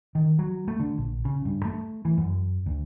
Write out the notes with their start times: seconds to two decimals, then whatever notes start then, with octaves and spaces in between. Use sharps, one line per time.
0.15 D#3
0.39 F#3
0.68 A3
0.80 D3
0.98 A#1
1.25 C#3
1.45 G2
1.65 A3
2.05 E3
2.18 F#2
2.66 D2